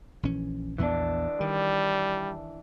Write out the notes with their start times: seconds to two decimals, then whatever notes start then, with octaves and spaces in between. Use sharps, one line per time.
0.23 A#1 E3 C#4
0.78 A#1 E2 E3 B3 D4
1.41 D#3 G3